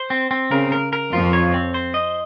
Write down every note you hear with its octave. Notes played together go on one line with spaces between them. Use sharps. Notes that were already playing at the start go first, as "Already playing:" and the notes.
Already playing: C5
C4
C4
C#3 A#4
A#4
A#4
F2 F3 F4
C#5
C4
C5
D#5